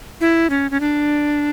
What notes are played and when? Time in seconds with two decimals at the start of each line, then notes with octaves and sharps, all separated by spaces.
0.21 E4
0.50 C#4
0.71 C#4
0.80 D4